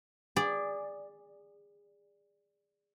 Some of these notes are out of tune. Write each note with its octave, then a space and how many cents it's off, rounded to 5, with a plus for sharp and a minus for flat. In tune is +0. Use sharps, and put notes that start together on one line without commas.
G#4 -25 D5 +0